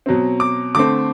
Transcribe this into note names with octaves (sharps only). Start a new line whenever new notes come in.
B2 F#3 C4
D6
D3 A3 C4 D6